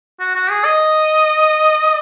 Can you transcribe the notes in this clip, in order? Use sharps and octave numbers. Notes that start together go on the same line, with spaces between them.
F#4
F#4
G#4
D#5